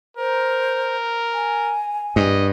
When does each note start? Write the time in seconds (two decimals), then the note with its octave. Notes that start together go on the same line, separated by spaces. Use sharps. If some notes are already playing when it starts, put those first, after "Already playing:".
0.17 A#4 C5
1.33 G#5
2.16 G2 D#5